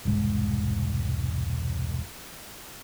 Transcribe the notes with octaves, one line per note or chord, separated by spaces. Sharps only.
E1 C2 G#2 G#3